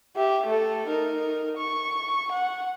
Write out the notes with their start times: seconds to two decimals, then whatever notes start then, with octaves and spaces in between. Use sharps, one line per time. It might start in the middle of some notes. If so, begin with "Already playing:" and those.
0.16 G4 E5
0.46 A3 A4
0.88 D#4 A#4
1.58 C#6
2.31 F#5